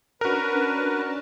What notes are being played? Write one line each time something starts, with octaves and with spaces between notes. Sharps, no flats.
C#4 D4 F#4 A#4 B4 A5